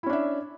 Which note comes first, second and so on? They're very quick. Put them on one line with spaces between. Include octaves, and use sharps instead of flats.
E4 C#4 D4 E5